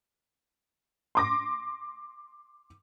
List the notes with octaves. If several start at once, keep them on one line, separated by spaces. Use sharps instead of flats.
C6 D6 A#6